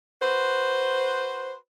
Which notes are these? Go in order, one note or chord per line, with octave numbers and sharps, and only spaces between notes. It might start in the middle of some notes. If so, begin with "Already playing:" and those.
F#4 B4 C5